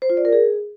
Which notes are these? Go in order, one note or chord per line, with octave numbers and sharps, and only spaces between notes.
C5
F4
D5
A#4
G#4